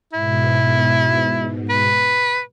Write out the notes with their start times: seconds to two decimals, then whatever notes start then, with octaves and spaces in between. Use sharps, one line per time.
0.13 G#2 B2 E4
1.69 B4